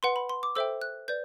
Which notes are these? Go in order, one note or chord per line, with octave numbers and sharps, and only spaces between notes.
B4 F#5 C6
B5
C6
D6
A4 C5 E5 G5 E6
F#6
B4 D5 G6